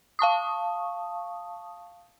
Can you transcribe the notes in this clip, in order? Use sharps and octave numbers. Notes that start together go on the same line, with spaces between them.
F5 A5 C#6 D#6